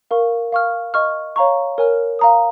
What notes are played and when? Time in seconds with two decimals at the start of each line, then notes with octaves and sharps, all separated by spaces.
0.11 A#4 F5 C#6
0.52 F5 C#6 F6
0.94 D#5 C#6 F6
1.36 C#5 F5 A#5 C#6
1.78 A#4 C#5 G#5 F6
2.19 F5 A#5 D#6